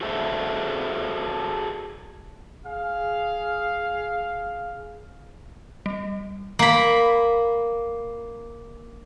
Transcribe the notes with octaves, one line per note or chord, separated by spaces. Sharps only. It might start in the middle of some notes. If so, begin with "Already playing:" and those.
F#4 G#4 A4 C5 E5
G#4 F5
G3
A#3 B5